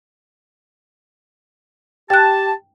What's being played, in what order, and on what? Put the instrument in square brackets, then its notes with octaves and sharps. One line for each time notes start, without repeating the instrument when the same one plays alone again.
[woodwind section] G4 A5 [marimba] G5 F#6